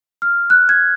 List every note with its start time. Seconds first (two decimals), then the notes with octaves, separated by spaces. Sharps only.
0.22 F6
0.50 F#6
0.69 G#6